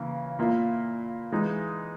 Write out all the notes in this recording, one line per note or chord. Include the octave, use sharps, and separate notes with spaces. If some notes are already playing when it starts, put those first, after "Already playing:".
Already playing: C#3 E3 A#3
A#2 A#3 E4
E3 G#3 D#4